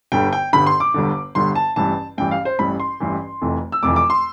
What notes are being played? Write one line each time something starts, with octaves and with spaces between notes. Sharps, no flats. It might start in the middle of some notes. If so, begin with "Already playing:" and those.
G1 G2 D3 G5
G5
G1 G2 D3 B5
C6
D6
G1 G2 D3
G1 G2 D3 C6
A5
A1 G2 E3 A5
A1 G2 E3 G5
F5
C5
A1 G2 E3 B5
C6
A1 G2 E3
F1 F2 E3
E6
F1 F2 E3 D6
D6
C6